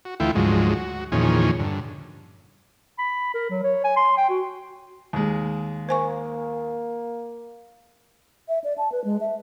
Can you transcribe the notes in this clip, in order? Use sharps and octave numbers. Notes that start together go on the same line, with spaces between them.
F#4
D2 E3 A3 E4 F4 G5
D2 G#2 F3 F#3 G#3
F#4
E2 A#2 D#3 F3 C#4 G#4
G2 D3
B5
A#4
F#3
C#5
G#5
C6
G5
F#4
D#2 G#3
A#3 C5 G#5 C#6
E5
D5
A5
B4
G#3
E5